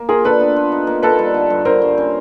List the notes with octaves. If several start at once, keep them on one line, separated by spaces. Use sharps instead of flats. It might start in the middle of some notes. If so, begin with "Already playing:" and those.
Already playing: A#3
F4 G#4 A#4
D4 A4 B4
B3
F4
D#4
A#3
A#3 A4 B4
G3
D3
G2
D3 A#4 C5
G2
C#4